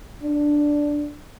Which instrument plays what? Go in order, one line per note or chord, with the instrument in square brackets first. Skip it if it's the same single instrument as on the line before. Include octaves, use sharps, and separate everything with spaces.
[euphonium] D4